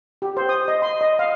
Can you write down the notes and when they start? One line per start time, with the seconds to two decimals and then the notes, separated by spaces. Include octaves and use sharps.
0.22 G4
0.37 C5
0.49 D#6
0.68 D#5
0.82 C6
1.01 D#5
1.19 F5